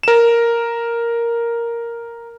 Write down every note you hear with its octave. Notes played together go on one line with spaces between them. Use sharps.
A#4 E7